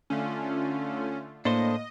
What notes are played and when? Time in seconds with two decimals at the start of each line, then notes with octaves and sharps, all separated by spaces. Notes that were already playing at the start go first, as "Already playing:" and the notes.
0.10 D3 A3 C#4 F4
1.45 A2 A#3 D4 A4 C5 D#5